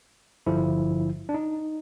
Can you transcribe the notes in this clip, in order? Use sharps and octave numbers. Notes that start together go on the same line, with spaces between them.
G#1 G2 D3 F3 E4
D4
D#4